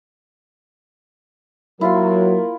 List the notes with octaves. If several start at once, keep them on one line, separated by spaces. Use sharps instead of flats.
F#3 A#3 E4 F4 A#4 C6